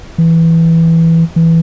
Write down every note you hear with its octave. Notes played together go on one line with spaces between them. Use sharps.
E3
E3